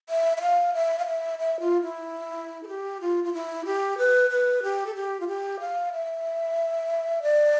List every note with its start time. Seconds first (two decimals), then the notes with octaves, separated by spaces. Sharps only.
0.09 E5
0.37 E5
0.41 F5
0.74 E5
0.98 F5
1.07 E5
1.39 E5
1.60 F4
1.82 E4
2.63 A4
2.68 G4
3.01 F4
3.24 F4
3.33 E4
3.65 G4
3.98 B4
4.30 B4
4.63 G4
4.86 A4
4.95 G4
5.20 F4
5.28 G4
5.60 F5
5.93 E5
7.23 D5